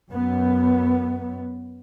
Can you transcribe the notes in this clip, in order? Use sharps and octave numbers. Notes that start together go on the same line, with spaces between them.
F#2 B3